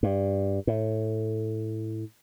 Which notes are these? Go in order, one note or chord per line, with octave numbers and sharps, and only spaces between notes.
G2
A2